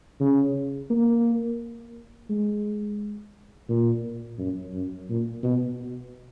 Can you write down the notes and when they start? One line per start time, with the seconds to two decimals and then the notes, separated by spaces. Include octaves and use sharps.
0.20 C#3
0.90 A#3
2.30 G#3
3.69 A#2
4.39 F#2
4.74 F#2
5.09 A#2
5.43 B2